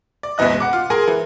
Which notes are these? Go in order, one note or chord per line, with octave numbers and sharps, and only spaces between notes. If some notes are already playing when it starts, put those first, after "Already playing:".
D5
F#1 C#2 B2 E3 D#5 F#6
F#5 D6
F4
G#4 A#4 G#5 C6
E3